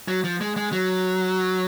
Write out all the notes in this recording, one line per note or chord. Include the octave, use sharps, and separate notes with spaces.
F#3
F3
G#3
G#3
F#3